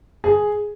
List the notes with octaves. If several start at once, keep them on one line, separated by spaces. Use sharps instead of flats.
G#4